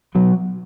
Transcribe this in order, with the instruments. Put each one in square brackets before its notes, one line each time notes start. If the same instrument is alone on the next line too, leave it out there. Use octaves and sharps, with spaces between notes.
[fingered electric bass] B2 F#3